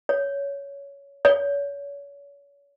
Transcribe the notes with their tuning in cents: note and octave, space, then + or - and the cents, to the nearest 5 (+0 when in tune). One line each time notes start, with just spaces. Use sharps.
C#5 +15
C#5 +35